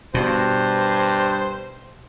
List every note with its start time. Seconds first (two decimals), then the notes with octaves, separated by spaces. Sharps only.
0.14 G2 B2 C5